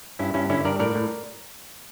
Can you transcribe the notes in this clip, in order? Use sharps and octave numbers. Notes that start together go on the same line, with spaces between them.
G2 C#4 E4
G2 C#4 E4
D3 C#4 E4
G2 A#4 D5
A2 A#4 D5
A2